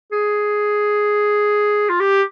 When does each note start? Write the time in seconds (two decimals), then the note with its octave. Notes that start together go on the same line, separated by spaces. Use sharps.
0.12 G#4
1.89 F4
2.00 G4